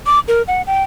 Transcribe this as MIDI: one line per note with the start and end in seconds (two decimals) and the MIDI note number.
0.06 0.19 86
0.28 0.42 70
0.48 0.62 78
0.67 0.83 79